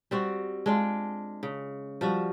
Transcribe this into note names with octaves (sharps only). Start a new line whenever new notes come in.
G3 C4 F#4
G#3 D4 F4
C#3
F3 G3 F#4